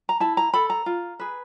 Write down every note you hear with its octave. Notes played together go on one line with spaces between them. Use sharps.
A#5
E4 A5
A#5
A4 B5
A#5
F4
G#4 B4